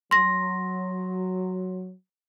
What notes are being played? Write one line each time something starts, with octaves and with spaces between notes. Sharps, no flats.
F#3 C6 A#6